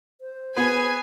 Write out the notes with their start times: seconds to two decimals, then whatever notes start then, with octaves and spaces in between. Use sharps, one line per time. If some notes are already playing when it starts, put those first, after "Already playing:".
0.21 C5
0.57 B3 G#4 B4 G#5